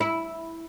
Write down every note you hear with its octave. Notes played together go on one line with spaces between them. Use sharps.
E4